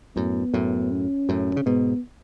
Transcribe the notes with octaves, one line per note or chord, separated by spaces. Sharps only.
F#2 A2 B3
F#2 A2
C#4
F#2 A2
C#3
G#2 B2 B3